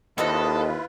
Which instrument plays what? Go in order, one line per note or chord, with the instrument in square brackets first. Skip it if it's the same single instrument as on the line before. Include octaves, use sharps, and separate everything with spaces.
[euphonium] D#2 [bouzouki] D#3 C4 D#5 [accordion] E4 F4 B4 [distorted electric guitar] A4